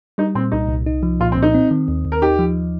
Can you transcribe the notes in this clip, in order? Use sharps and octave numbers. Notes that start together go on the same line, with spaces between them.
G3 D#4
A#2 C4
C2 D#4
C2
D#4
F3
A#2 F4
C4
A#2
D#4
C4
D#3
D#2
D#2
A#4
D#4 G4
F3